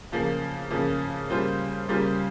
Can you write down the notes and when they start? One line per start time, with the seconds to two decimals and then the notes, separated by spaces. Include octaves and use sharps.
0.12 C#3 F3 A#3
0.70 C#3 F3 A#3
1.30 C#3 G3 A#3 F4 C5
1.88 C#3 G3 A#3 F4 C5